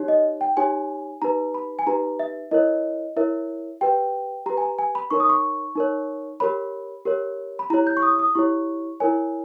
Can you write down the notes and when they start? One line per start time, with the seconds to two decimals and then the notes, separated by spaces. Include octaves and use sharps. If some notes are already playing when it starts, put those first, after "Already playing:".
Already playing: D#4 G4 C#5
0.08 D#5
0.41 G5
0.57 D#4 G4 C#5 G#5
1.22 D#4 G4 B4 A#5
1.54 B5
1.79 G#5
1.86 D#4 G4 B4 A#5
2.19 E5
2.51 E4 A#4 C#5 D#5
3.17 E4 A#4 C#5 E5
3.81 G4 B4 G5
4.46 G4 B4 A#5
4.57 G#5
4.62 A#5
4.79 G#5
4.95 B5
5.10 D#4 A#4 C#5 C#6
5.20 D#6
5.29 C#6
5.76 D#4 A#4 C#5
6.40 G4 A#4 C#5 B5
7.05 G4 A#4 C#5
7.59 B5
7.70 E4 G4 C#5 A#5
7.87 G6
7.97 C#6
8.03 D#6
8.19 D#6
8.35 E4 G4 C#5 C#6
9.00 E4 A#4 C#5 G#5